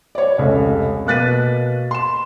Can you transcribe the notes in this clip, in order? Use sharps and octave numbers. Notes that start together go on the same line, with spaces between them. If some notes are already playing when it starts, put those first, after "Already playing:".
C#5 D5
F1 C#2
B2 A#3 F#6 A6 B6 D#7
C6 E7